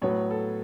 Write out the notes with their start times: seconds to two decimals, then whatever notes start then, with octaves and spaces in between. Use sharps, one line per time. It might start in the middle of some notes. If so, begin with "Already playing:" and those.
0.02 A2 F#3 B3 C#5
0.31 A4